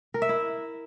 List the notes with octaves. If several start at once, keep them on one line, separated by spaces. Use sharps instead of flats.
A#4
E5
E4